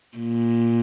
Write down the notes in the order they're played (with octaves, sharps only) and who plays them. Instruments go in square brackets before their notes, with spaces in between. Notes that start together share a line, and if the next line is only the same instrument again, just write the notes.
[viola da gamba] A#2